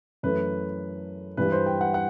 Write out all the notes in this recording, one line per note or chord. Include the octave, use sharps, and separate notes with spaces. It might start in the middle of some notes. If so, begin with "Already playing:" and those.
F#2 E3 A3 B4
G2 E3 G3 B4
C5
G5
F#5
F#5